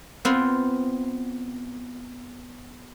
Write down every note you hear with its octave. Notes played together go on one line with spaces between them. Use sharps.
B3 C4 F4